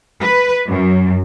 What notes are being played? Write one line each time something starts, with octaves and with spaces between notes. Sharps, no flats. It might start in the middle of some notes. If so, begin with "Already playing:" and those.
B4
F#2